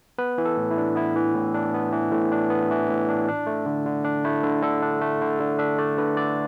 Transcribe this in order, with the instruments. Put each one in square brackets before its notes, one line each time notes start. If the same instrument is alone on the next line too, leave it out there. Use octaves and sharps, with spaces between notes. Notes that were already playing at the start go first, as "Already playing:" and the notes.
[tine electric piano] B3 B4
E3
A4
A2
E4
D4
B3 E4
E3
A2
D4
B3
E3
A2
D4
B3
E3
A2
D4
D4
A3
D3
D3
D4
A3 E4
D3
D3 A4
D4
A3
D3
D3
D4 E5
A3 D5
D3 B4
D3 D5